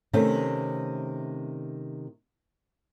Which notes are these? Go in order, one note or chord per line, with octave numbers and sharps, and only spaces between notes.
C3 D#3 A3 C4 C#4